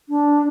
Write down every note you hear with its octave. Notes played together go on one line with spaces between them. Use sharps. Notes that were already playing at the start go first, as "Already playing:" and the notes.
D4